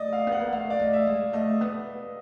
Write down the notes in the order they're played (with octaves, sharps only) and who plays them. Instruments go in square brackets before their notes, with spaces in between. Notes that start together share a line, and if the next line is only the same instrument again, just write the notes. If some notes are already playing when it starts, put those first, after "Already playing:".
Already playing: [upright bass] A3 [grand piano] D5 D#5
[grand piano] F5
[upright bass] B3
[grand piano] F#5
[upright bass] A#3
[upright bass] A3 [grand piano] F5
[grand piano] D5
[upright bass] A3 [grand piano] D#5
[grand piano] E5
[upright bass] G#3
[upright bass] A3 [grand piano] D#5
[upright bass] B3